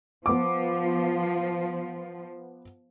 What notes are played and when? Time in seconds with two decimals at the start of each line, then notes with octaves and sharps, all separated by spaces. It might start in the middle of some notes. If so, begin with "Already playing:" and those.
0.26 F3 B3 D6